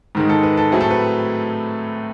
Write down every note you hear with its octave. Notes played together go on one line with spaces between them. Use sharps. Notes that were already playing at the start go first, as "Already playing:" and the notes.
G#2 D#3 G#3
A4
B4
A4
A2 F#3 A3 C4 G#4
A4
B4